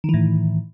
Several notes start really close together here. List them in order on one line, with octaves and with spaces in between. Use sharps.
D#3 E3 A2